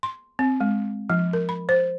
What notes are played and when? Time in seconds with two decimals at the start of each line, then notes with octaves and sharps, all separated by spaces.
0.03 C6
0.39 C4
0.60 G#3
1.10 F3
1.33 A#4
1.49 B5
1.69 C5